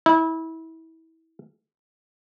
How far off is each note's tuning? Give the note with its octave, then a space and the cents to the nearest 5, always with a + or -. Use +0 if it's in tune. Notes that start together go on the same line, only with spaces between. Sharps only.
E4 -25